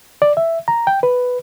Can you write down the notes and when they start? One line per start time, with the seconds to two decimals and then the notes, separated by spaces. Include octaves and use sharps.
0.22 D5
0.37 E5
0.68 A#5
0.87 G5
1.03 B4